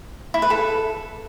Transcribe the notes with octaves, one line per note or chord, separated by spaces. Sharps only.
E4
B4
A4